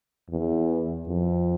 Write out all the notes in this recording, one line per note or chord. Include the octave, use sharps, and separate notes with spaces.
E2
F2